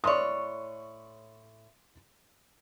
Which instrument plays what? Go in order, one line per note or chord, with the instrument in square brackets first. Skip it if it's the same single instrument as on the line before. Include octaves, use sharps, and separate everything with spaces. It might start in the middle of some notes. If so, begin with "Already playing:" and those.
[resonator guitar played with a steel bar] A2 C#5 [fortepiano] D5 C6 D#6